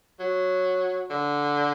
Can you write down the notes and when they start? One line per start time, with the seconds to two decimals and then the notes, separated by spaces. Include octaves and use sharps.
0.20 F#3
1.10 D3